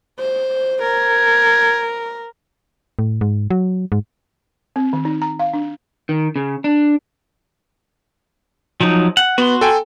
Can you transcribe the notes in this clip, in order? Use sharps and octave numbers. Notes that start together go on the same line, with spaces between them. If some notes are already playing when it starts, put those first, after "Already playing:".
C5
A#4 G#6
A2
G#2
F#3
G#2
C4
D#3
D#4
A#5
F5
D4
D#3
C#3
D4
F3 F#3 D#4
F#5
B3 F#4 C6
A4 G5 G#5